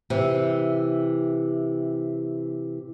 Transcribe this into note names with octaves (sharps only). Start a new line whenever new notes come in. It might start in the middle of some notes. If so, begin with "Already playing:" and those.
C3 E3